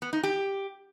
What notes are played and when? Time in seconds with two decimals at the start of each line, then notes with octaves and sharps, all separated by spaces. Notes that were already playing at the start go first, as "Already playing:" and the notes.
0.02 B3
0.13 D#4
0.23 G4